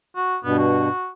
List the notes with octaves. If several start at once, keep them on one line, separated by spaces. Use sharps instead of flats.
F#4
G2 B2 B3
F#4